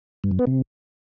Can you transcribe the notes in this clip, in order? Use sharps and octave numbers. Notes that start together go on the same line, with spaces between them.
G2
F#2
B3
C3